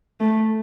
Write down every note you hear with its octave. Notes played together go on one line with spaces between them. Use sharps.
A3